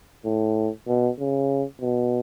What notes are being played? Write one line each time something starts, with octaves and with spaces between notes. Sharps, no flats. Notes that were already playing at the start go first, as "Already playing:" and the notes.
A2
B2
C#3
B2